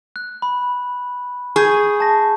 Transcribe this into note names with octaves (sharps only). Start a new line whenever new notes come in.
F#6
B5
G#4 C#6 G6
A5 A#6